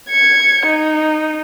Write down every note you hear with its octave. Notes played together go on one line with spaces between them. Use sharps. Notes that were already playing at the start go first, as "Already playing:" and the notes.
G#6 C#7
D#4